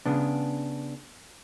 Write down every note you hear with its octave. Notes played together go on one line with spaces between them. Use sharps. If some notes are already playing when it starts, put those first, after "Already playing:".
C#3 B3 D4